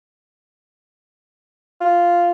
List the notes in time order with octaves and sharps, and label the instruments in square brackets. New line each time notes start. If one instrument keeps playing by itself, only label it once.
[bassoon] F4